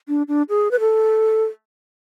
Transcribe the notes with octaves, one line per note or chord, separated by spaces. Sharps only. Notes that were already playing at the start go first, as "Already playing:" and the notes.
D4
D4
G#4
B4
A4